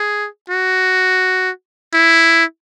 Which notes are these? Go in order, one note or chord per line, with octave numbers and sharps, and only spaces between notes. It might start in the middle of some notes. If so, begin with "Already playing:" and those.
Already playing: G#4
F#4
E4